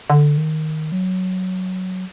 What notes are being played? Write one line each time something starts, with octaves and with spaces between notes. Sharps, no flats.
D3
D#3
F#3